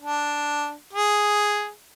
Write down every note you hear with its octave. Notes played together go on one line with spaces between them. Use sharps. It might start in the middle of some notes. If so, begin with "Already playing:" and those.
D4
G#4